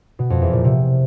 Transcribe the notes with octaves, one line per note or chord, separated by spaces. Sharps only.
B2
F2
E2
A#2
C3